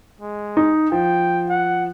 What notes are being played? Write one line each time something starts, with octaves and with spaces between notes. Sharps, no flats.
G#3
D#4
F3 G5
F#5